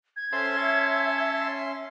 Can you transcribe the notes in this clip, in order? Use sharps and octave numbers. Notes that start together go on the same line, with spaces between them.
G#6
C#4 A4 C5 E5 C6
C#5 E5 A5 E6